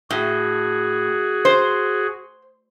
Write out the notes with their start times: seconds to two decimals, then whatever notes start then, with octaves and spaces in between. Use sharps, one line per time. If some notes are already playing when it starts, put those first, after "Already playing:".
0.10 A2 F#4 G#4
1.45 C5